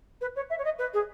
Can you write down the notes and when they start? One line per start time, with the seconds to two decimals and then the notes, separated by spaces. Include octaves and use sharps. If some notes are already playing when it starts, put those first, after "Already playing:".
0.21 B4
0.36 C#5
0.50 E5
0.58 C#5
0.64 D#5
0.78 B4
0.93 G#4